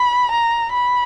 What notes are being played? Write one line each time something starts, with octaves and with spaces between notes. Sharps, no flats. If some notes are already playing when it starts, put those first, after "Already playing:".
Already playing: B5
A#5
B5